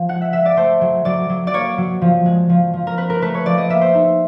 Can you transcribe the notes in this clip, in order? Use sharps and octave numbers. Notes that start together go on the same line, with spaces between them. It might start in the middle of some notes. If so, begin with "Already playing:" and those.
Already playing: F3
G#3 F#5
E5
G#3 E5
D5
A3 C5
F#3
F#3 D5
F#3
D5
A#3 C#5
F#3
F3
G#3
F3
F3
A#4
C4 B4
A#4
A3 B4
C#5
F3 D5
D#5
A#3 E5
C5
D#4